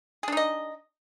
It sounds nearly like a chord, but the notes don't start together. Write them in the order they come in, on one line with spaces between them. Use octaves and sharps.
G#4 D4 D#4 D#5